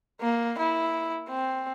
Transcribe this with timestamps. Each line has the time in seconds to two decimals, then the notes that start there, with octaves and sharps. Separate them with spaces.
0.21 A#3
0.59 E4
1.29 C4